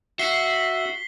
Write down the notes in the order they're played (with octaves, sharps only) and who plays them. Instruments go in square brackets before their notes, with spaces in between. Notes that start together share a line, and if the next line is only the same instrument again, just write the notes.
[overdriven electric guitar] F#4 [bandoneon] E5 [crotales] B6 G7 [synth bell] C7